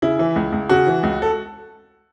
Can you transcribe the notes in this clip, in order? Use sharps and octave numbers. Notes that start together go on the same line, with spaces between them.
C#3 E4
E3
C#2
C#2
C#3 F#4
E3
C#2
A4